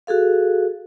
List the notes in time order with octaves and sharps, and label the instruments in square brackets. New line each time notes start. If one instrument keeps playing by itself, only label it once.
[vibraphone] F#4 G#4 A4 F5